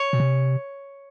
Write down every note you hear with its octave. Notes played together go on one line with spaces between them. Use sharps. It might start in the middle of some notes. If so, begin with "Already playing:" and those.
Already playing: C#5
B2
C3